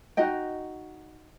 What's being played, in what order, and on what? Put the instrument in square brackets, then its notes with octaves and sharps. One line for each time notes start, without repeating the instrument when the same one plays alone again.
[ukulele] D#4 F#4 D#5 G5